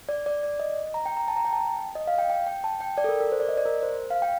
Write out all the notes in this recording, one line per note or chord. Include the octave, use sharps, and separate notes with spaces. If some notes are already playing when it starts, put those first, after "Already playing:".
D5
D5
D5
D#5
A#5
G5
A#5
A5
A#5
G5
A5
D#5
F5
G5
G5
G5
A5
G5
D5
A4
A#4
A#4
C5
D5
D#5
D5
A#4
C5
F5
G5